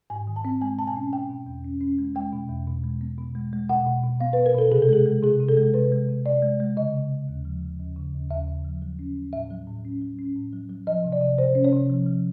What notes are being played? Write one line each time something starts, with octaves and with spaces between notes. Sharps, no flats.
G#2 G#5
D#3
A5
C4
G#3 G#5
B2 A5
G#5
C#4
C#4 G5
B2
E2
C#4
C#4
G#3
G#3 G5
B2
E2
B2
G#3
B3
B2
G#3
G#3
B2 F#5
B2
B2
B3 F5
B4
B2
A#4
B2 A4
C3 G#4
A4
G#3 G#4
G#3
C3 G#4
C3
A4
G#3
C3 B4
G#3
C3
C3 D5
G#3
G#3
C#3 D#5
C#3
C#3
D#2
F3
F3
D#2
C#3
D#2
D#2 E5
C#3
F3
F#3
C#4
C#4
A2 E5
F#3
A2
C#4
F#3
C#4
A2
F#3
F#3
F3 D#5
C3
D5
C3
C3 C5
C#4
C#5
C3
F3
F3